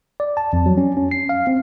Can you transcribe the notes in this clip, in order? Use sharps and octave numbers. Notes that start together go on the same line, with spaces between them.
D5
A5
F2
F#3
C#4
C#4
C7
F5
C4